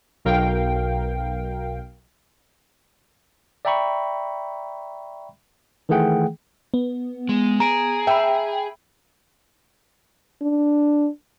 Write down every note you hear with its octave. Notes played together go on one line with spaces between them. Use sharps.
B1 B2 A#4 F5 G5
D5 E5 G5 A#5 B5 C#6
D#3 E3 A3 G#4 F#5 G5
B3
G#3
G#4 A#5 D7
E5 G5 B5
D4